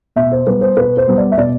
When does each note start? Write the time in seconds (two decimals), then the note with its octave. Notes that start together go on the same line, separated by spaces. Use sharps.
0.16 B2 E5
0.32 C5
0.47 G3 B3 B4
0.61 C5
0.77 B2 B4
0.97 C5
1.07 G3 B3
1.18 D5
1.32 E5
1.37 B2 D5